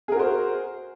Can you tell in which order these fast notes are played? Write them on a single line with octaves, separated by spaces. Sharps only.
G#4 A#4 F#4 C5